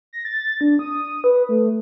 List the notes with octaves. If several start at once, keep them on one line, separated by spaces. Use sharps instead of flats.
A#6
A6
D4
D#6
B4
A3